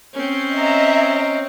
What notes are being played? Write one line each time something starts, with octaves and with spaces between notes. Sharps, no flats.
C4 C#4
D#5 E5 A#5